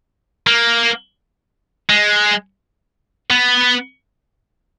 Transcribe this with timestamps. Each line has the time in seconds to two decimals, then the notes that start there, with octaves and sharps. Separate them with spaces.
0.47 A#3
1.90 G#3
3.30 B3